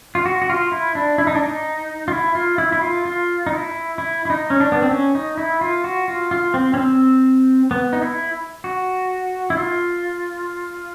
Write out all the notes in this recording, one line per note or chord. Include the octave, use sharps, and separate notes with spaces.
F4
F#4
F#4
F4
E4
D4
E4
D#4
D4
D#4
F4
E4
F4
E4
E4
F4
F4
D#4
E4
E4
E4
D#4
C#4
D4
B3
C4
C#4
D#4
E4
F4
F#4
F4
F4
C4
C#4
C4
B3
D#4
E4
F#4
E4
F4